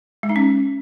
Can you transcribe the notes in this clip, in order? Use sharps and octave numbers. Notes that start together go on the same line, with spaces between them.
G#3
D#4
C#4